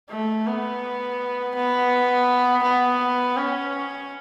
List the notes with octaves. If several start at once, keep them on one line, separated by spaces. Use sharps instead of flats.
A3
B3
B3
B3
C#4